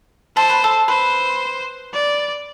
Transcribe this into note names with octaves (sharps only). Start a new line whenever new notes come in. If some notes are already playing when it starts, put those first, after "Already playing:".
A4 C5
B4
A4
B4 C5
D5